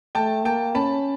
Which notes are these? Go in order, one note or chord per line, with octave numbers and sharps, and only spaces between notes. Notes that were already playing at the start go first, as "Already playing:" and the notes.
A3 G5 A5
A#3 G5 A5
C#4 A5 B5